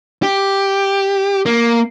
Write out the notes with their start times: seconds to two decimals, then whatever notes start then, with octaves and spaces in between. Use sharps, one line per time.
0.23 G4
1.46 A#3